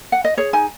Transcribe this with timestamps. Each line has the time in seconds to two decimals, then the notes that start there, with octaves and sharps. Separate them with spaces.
0.12 F#5
0.25 D#5
0.37 G#4 C#5
0.53 D#4 G#5